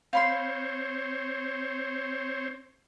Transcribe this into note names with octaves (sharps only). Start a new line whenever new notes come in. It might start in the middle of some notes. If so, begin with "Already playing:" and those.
C4 C5 C#5 F5 B5 C6